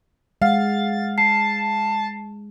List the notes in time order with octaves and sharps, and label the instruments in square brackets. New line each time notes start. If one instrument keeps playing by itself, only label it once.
[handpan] G#3 [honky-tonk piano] F5 [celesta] F#5 [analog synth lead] A6
[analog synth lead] A5 [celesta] C7